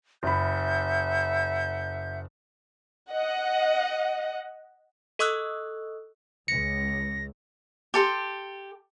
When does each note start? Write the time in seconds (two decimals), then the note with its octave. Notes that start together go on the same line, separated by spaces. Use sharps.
0.23 F#1 E5 F#5 B5 G6
3.10 D#5 F#5
5.19 A4 D#5 C#6 D#6 E6 F#6
6.48 C#2 A#6 C#7
7.94 G4 A4 C6